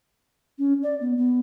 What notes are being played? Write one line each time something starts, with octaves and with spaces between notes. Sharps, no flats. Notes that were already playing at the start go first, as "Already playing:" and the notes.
C#4
D5
B3
B3